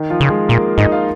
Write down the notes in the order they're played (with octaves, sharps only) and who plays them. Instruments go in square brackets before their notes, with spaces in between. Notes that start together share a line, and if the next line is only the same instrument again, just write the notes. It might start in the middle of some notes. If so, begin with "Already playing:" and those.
Already playing: [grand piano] D#3 D#4
F3 F4
[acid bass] C#3 [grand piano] F4
[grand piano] G#3 G#4
[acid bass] A#2 [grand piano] A#3 A#4
[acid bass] G#2 [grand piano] D#4 D#5
[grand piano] F4 F5